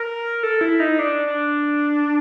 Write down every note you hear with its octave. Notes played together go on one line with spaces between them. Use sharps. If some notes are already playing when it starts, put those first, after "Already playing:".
Already playing: A#4
A4
E4
D#4
D4
D4